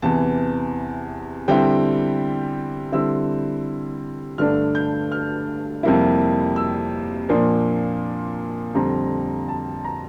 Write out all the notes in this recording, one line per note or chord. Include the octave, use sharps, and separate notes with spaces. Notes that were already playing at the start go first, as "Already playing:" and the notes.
E2 C3 E3 A5
D3 G3 C4 E4 G5
D3 G3 C4 E4 E6
G2 D3 A3 D4 F6
G6
F6
F2 C3 G3 A#3 E4
E6
A#2 F3 A#3 D4 C6
F2 D3 G3 C4 A#5
A5
A#5